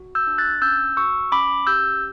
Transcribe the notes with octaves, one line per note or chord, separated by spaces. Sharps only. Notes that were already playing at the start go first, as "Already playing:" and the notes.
Already playing: F#4
E6 G6
D4
F#6 A6
C#4 E6 G6
F#4 C#6 E6
C#4 B5 D6
G4 E6 G6